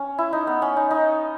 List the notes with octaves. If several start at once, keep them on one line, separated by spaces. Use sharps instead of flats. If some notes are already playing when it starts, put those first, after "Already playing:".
Already playing: C#4
E4
D#4
B3
C#4
D#4
D#4